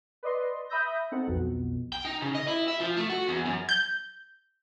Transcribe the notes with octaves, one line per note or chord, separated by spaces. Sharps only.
B4 D5 D#5 C6
E5 B5 D#6 E6 G6 A#6
C4 D#4 A4 F#5
B1 F2 B2
G5
D#4
C#3
D#5
E4
E5
F3
A3
F#4
E2
F#2
G6